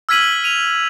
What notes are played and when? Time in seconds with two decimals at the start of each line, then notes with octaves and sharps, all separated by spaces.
0.09 E6 F6 G#6 B6 D#7 F#7
0.44 D#7 F7